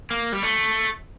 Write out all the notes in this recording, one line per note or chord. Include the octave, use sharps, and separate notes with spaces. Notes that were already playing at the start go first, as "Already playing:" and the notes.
A#3
G3
A3